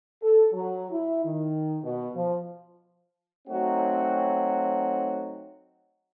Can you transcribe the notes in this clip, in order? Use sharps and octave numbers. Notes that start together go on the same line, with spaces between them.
A4
F#3
E4
D#3
B2
F3
F#3 A3 C4 D#4 F#4